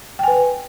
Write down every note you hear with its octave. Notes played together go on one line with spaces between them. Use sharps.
B4 G5 G#5